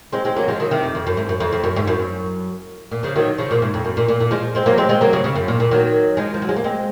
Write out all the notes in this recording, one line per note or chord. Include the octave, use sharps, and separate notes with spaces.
G#3 C4
G#3 C4
F#3 A#3
F3 G#3
D#3 F#3
C3 D#3
F2
F2
F#2
G#2
F#2
F2
F2
F#2
G#2
F#2
A#2
C#3 F3
D#3 F#3
C#3 F3
A#2
G#2
F2
F#2
A#2
A#2
A#2
F3 G#3
G#3 C4
F#3 A#3
G#3 C4
G#3 C4
F#3 A#3
C#3
C#3
F#2
A#2
A#2
D#3 F#3
F3 G#3
F3
F#3
G#3
A#3
G#3 C4